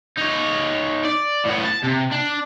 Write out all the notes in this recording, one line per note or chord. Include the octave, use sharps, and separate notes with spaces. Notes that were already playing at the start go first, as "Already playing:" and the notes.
D#4 C#5
D5
A2 B3
A5
C3
D4